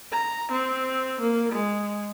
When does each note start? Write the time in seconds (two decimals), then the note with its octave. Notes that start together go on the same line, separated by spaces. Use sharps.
0.12 A#5
0.52 C4
1.21 A#3
1.52 G#3